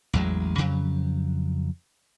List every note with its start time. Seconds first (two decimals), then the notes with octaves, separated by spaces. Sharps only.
0.13 A1 E2 F#3 G#3
0.58 F2 C#3 F#3